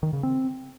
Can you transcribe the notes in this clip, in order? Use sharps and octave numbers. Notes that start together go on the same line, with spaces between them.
D#3
C#3
C4